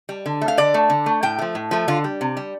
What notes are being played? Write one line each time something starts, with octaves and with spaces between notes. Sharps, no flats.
G3
D3
A3
F5
D3 D5
A3
D3
A3
A2 G5
F3 A3
A2
F3 A3
D3 F4
G3
C3
G3